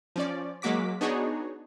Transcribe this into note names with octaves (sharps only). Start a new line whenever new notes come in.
F3 C#4 D5
F#3 G#3 A#3 F#4 D6 B6
B3 D4 D#4 F#4 G#4 C#5